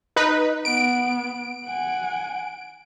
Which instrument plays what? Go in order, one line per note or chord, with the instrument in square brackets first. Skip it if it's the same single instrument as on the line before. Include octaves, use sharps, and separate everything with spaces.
[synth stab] D#4 B4
[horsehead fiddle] B3 [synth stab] D7
[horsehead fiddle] F#5 G#5